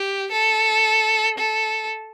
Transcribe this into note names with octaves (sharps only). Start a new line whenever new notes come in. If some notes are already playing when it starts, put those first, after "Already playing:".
Already playing: G4
A4
A4